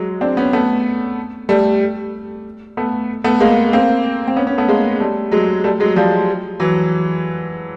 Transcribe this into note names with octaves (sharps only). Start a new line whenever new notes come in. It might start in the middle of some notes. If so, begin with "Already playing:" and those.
Already playing: F#3 G#3
C4 D4
B3 C#4
A3 B3
G3 A3
A3 B3
A3 B3
G#3 A#3
A#3 C4
C4
B3 C#4
B3 C#4
A3 B3
G#3 A#3
G3 A3
F#3 G#3
G3 A3
F#3 G#3
F3 G3
E3 F#3